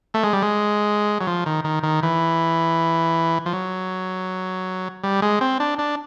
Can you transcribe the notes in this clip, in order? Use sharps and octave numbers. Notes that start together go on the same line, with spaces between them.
A3
G#3
G3
G#3
F#3
F3
D#3
D#3
D#3
E3
F3
F#3
G3
G#3
C4
D4
D4